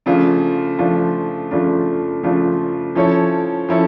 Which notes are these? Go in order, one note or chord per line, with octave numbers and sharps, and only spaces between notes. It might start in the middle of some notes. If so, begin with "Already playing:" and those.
C#3 F3 A3 D4 F4
C#3 F3 A3 D4 F4
C#3 F3 A3 D4 F4
C#3 F3 A3 D4 F4
F3 C#4 E4 A4 C#5
F3 C#4 E4 A4